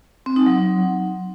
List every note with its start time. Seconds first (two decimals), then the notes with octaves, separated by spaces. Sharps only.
0.26 C4
0.36 D#4
0.46 F#3